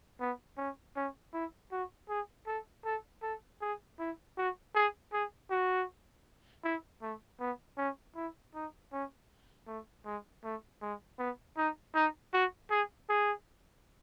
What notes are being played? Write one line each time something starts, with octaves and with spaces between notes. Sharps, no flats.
B3
C#4
C#4
E4
F#4
G#4
A4
A4
A4
G#4
E4
F#4
G#4
G#4
F#4
E4
A3
B3
C#4
E4
D#4
C#4
A3
G#3
A3
G#3
B3
D#4
D#4
F#4
G#4
G#4